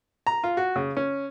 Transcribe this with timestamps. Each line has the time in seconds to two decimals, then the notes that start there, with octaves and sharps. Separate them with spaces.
0.27 A#5
0.44 F4
0.57 F#4
0.76 C#3
0.97 C#4